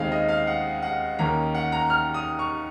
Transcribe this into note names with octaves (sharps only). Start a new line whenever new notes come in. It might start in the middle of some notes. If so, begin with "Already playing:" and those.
Already playing: D#2 C#3 G#3 C4 D#4 F5
D#5
F5
F#5
F#5
D#2 D#3 A#3 C#4 A#5
F#5
A#5
F6
D#6
C#6